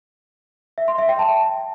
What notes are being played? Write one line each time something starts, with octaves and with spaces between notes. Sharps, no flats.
E5
C6
E5
G5
A5